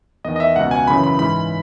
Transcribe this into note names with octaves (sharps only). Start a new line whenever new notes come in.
E2 D#3 D#5
D#5
E5
C#2 B2 F#5
G#5
F#2 C#3 E3 B5
B5
G#2 E3 B5